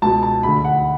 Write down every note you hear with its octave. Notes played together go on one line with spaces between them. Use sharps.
C#2 B2 A5
A5
D2 D3 B5
F#5